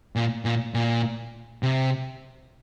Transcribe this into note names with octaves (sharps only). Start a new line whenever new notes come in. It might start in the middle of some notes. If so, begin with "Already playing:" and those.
A#2
A#2
A#2
C3